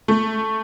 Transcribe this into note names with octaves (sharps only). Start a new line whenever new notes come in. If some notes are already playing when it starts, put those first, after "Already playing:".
A3